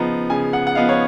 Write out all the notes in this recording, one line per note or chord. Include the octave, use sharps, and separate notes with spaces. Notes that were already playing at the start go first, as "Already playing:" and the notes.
Already playing: C#3 F3 B3 D#4 A#5
C#3 G#5
F#5
F#5
F3 B3 D#4 F5
C#5